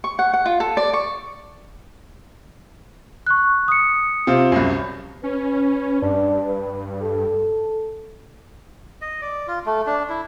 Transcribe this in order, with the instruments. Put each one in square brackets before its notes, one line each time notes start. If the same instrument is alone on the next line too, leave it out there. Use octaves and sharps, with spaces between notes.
[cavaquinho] C#6
F#5
F#5
F4
A4
D5
C#6
[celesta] C#6 F#6
D#6 C#7
[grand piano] C3 C4 F4
C2 F#2
[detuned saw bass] C#4 [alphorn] B4
[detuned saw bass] G2 [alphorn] D4
[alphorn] B4
A4
[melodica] D#5
D5
F4
A3
D4
E4